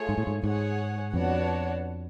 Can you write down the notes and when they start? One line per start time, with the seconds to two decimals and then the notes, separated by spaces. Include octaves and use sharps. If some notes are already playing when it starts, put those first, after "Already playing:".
Already playing: A3 F4 G#4 C#5
0.09 G#2
0.18 A2
0.27 G#2
0.43 G#2 G#4 C#5 F#5
1.12 F2 B3 D4 F#4 C#5 F#5